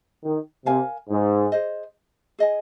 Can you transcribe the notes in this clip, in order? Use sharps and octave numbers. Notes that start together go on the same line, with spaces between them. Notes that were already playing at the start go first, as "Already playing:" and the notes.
D#3
C3 A#4 F5 G#5
G#2
G#4 C5 D#5
G#4 D#5 G#5